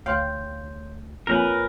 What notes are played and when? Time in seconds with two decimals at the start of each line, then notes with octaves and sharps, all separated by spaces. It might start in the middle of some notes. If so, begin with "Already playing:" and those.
0.06 D2 C#5 F5 G5 C6 G6
1.27 F2 A#3 F4 A#4 B4 C#5 G#5